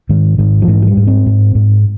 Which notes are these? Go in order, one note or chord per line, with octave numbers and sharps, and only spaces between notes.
G#2 D#3
G#2 D#3
F3
G#2 E3
F#3
G3
G#2
C4
G#2
G#2